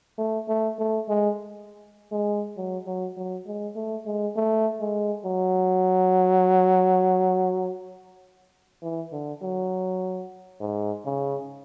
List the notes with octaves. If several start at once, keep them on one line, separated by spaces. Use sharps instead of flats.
A3
A3
A3
G#3
G#3
F#3
F#3
F#3
G#3
A3
G#3
A3
G#3
F#3
E3
D3
F#3
G#2
C#3